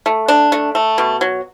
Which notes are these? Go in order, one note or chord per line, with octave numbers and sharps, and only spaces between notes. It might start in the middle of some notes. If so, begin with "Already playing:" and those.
A3
D4
A3
A3
B2
F#3